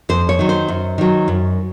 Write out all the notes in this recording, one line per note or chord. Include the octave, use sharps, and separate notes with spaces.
F2 C5
C#5
D#3 F#3
C5
F#2
D#3 F#3
F#2